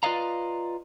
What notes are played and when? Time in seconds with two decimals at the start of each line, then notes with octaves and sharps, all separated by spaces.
0.03 F4 B4 D5 D#5 F5 A#5